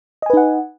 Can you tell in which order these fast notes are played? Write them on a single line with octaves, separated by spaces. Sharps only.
D#5 G#5 B4 D#4 F#5